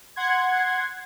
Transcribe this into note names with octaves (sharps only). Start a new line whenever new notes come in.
F#5 C6 G#6